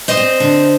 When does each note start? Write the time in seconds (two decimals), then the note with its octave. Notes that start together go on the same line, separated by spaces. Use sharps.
0.08 C5 D#5
0.17 C4
0.40 D3